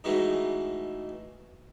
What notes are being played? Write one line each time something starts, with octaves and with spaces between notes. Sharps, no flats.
B2 D#3 E3 G#3 A3